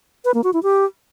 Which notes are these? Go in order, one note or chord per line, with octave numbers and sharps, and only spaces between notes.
B4
A#3
F#4
E4
G4